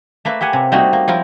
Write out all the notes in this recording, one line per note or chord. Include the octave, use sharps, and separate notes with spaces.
A3 A#3 B4 E5
G4 E5 F#5 G#5
C3
G3 A3 A#3 C4 D#4 F#4
A#3
F3 E4 F4 A#4